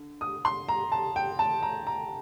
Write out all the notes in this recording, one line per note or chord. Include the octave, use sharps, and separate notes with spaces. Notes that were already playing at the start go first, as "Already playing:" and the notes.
Already playing: D3
D#6
C6
A#5
A5
G5
A5
A#5
A#5